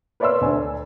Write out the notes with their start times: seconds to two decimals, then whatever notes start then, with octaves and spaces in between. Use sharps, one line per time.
0.20 B4 C#5 D5 E5 C6 E6
0.41 D2 D4 G#5